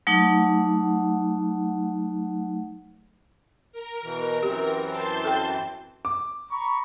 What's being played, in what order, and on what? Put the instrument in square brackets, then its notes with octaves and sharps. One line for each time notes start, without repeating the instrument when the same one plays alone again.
[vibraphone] F#3 A3 D#4 F#5
[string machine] A#4
[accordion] B2 E3
[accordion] F#2 E3 C4 [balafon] G4
[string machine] A5 C6 G6
[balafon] A4 G5
[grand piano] D6
[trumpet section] A#5 B5 C#6